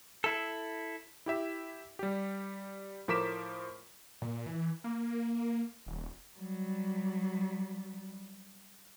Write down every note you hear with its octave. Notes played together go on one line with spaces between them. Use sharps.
E4 A4
E4 G4 E5
G3 G4
A2 F3 A#4 D6 B6 E7
A#2
E3
A#3
D#1
F#3 G3